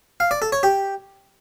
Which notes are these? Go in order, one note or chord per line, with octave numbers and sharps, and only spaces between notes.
F5
D5
A4
C#5
G4